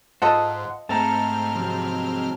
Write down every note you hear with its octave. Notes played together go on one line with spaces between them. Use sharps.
G#2 F4 A4 C5 D#5 F#5
G#2 A3 C4 A5 A#5 F6
F2 C3 F#3